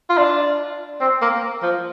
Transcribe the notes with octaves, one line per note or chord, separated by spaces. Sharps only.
F4
D4
C4
A#3
F3